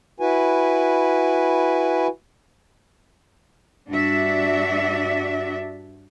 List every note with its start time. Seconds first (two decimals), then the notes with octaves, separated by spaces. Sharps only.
0.20 E4 F#4 B4 G#5
3.88 G2 D4 F#4 D5 E5